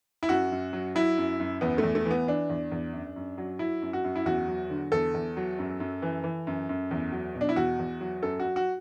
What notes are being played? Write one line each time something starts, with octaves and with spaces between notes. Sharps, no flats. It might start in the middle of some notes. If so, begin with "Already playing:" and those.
E4
F#2 F#4
F#2
F#3
F#3 E4
F#2
F#2
E2 B3
A3
E2
A3
E3 B3
E3 D4
E2
E2
F#2
F#2
F#3
F#3 E4
F#2
F#4
F#2
E4
E2 F#4
F#3
D3
E2 A4
E2
F#3
F#2
F#2
E3
E3
F#2
F#2
E2
F#3
B2
D4
E4
E2 F#4
E2
F#3
F#2 A4
F#4
F#3
F#4